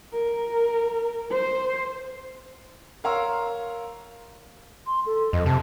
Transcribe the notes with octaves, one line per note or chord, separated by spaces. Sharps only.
A#4
C5
A#4 C#5 F5 A#5 C6 E6
C6
A4
F2 D#5
C3 A5